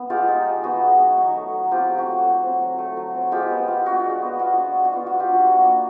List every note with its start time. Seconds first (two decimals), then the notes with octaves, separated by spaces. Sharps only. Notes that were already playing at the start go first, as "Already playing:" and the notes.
Already playing: B3 D#4
0.10 G#3 F4 G4
0.28 D#4
0.46 G#3
0.64 B3 F#4
0.82 G#3
1.00 D#4
1.17 F#3 F#4
1.35 A3
1.53 F#3
1.71 C4 F4 G4
1.89 F#3
1.98 F#4
2.07 A3
2.25 F#3
2.43 C4
2.61 F#3
2.78 A3
2.97 F#3
3.14 C4
3.32 G#3 F4 G4
3.50 B3
3.68 F4
3.86 D4 F#4
4.04 G#3
4.22 B3
4.39 F4 F#4
4.57 D4
4.75 G#3
4.85 F#4
4.93 B3 F4
5.07 F4 F#4
5.20 F4 G4
5.29 D4 F#4
5.47 A#3 F#4
5.64 D4